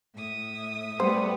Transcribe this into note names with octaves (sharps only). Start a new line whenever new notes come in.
A2 E5 D#6
G3 A3 B3 C5